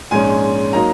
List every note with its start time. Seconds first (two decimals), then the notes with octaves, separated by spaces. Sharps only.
0.11 A#1 G#2 G#3 C#4 G#5
0.73 F#3 A#3 D#4 A#5